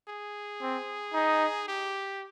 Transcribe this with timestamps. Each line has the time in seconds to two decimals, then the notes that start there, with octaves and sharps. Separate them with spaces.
0.08 G#4
0.62 C4
1.14 D#4
1.68 G4